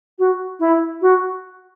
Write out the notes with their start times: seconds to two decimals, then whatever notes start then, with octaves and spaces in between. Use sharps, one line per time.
0.19 F#4
0.59 E4
1.01 F#4